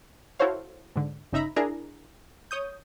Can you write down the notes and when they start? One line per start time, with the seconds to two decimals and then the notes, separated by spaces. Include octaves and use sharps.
0.39 E4 F#4 A4 C5 C#5 F5
0.96 G#2 D3
1.33 G1 C#3 D#4 E5 A#5 B5
1.56 D4 E4 G#4 A#4 A#5
2.51 C#5 D#6 G6